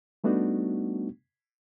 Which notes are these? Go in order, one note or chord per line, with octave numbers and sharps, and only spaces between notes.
G3 A3 B3 D4 D#4 F#4